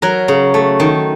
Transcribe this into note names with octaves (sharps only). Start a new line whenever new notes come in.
F#3 A#4
C#3
A3
D#3